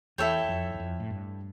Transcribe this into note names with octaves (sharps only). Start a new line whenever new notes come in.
E2 E4 A4 C#5 G5
F2
E2
F2
A2
G2